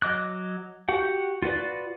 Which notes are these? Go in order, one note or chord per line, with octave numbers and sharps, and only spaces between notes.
F#3 D#5 D6 F#6
F#4 G4 F#5
F4 F#4 B4 D5